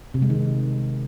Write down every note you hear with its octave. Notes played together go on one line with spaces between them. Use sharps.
C3
G#3
D#3